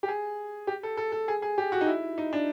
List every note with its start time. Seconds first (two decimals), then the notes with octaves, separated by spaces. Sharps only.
0.03 G4
0.08 G#4
0.67 G4
0.83 A4
0.97 A4
1.12 A4
1.28 G#4
1.42 G#4
1.58 G4
1.72 F#4
1.81 D#4
1.87 E4
2.18 D#4
2.33 D4